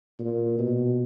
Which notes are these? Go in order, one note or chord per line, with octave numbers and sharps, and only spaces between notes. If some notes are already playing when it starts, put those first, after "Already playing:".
A#2
B2